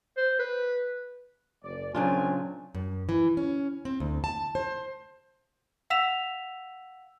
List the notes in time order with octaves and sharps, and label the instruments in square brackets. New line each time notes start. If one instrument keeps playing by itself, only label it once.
[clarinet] C5
B4
[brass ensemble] F#1 D5
[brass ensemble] A#1 C4 G#5 [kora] C#3 D4 F4 [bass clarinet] F#3
[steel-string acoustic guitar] F#2
E3
C#4
C4
D2
A5
C5
[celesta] F5 F#5 E6 B6 E7 F7